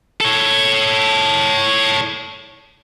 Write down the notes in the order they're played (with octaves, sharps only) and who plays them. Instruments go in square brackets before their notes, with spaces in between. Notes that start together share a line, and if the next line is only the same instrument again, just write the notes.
[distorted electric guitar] A4 C#5